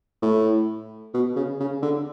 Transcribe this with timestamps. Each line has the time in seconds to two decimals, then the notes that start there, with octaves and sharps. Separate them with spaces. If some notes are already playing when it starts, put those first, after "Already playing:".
0.22 A2
1.14 B2
1.36 C#3
1.60 C#3
1.83 D3